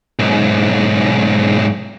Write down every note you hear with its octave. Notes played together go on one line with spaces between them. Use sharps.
B1 G#2